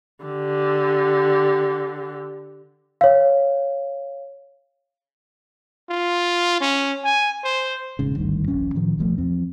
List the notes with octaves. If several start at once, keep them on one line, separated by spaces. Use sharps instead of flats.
D3 G4
C#5 F5
F4
C#4
G#5
C5
E1 G#2 C#3
G#1 D2 G2 D#3
D#1 A#1 C#4
A2 D#3 F3
D#1 B1 F3 A3
E2 F3 C4